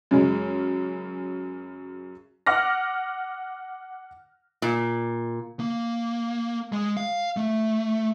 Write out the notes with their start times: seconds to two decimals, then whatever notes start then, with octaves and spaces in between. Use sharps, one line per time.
0.11 F#2 C#3 G#3
2.46 F#5 D6 F6 A#6
4.62 A#2
5.60 A#3
6.72 G#3
6.97 F5
7.37 A3